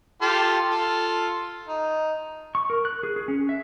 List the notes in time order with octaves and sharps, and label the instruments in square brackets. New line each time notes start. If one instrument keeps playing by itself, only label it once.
[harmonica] F4 G4 A4
F4 A4
D#4
[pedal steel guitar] C#6
A#4
F#6
G#4
G#4
C#4
E5